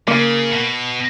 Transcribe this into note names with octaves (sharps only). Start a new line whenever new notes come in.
C#3 A#3
B2